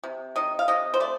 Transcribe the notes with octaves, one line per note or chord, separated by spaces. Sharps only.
C3
D#3 D#5
F5
C3 D#5
C5
A3 D5